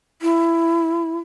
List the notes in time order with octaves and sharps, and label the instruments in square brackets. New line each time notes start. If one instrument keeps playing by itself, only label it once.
[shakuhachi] E4